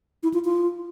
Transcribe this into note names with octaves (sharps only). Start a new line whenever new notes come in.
E4
F4
F4